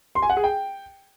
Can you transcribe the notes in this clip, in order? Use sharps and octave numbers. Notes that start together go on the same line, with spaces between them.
C6
G#5
F#5
G#4
G5